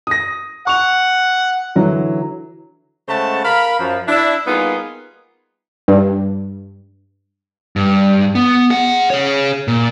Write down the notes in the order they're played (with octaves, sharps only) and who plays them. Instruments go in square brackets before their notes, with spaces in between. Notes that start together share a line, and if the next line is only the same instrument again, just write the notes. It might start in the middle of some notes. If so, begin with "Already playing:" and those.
[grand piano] D#6 A#6
[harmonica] F#5 [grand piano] C#6 F7
[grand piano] D3 E3 F#3
[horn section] C#3 G#3 A3 C5 F#5 A5
A#4 F5 B5
F#2 F3
D4 E4
G3 A#3 B3 D#4 F4 G#4
[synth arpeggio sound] G2
[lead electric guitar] G2
B3
G#4 F#5
G#4 C#5
A#2